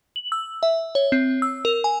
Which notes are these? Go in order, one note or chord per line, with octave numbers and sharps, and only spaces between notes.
F#7
E6
E5
C#5
C4
E6
A#4
G#5